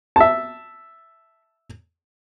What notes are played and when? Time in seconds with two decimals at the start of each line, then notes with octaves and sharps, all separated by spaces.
0.16 E5 A5